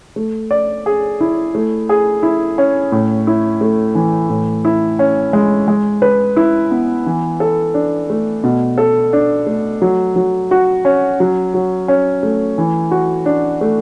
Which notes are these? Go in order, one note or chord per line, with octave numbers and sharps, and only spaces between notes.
A3
D5
G#4
E4
A3
G#4
E4
C#4
A2
E4
A3
E3
A2
E4
C#4
G#3
G#3
B4
E4
B3
E3
A4
D4
A3
B2
A4
D4
A3
F#3
F#3
F#4
C#4
F#3
F#3
C#4
A3
E3
F#4
D4
A3